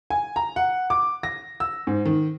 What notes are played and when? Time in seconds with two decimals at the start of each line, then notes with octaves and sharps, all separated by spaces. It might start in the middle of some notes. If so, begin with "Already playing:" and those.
0.10 G#5
0.36 A#5
0.56 F#5
0.90 D6
1.23 A#6
1.60 E6
1.87 G#2
2.05 D#3